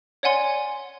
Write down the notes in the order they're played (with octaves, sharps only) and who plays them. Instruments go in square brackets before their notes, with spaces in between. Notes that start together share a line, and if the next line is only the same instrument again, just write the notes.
[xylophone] C#5 D5 F#5 G#5 C6